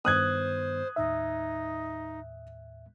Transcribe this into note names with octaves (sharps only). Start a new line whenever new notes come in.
G2 D#3 B3 C5 D#6 F#6 G#6
D#2 A2 D#4 E5